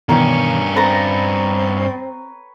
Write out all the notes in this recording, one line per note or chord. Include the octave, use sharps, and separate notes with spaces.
G2 B2 D#3 E3 C#4 A#4 C#5 G5
C4 B4 C#5 A#5 B5 A6 A#6